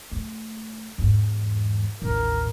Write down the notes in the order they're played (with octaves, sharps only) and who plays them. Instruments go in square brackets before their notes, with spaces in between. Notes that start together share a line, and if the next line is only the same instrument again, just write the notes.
[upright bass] A3
E2 G#2
[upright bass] A1 D#2 [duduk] A#4